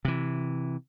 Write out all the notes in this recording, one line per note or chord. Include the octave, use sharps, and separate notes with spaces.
C3 E3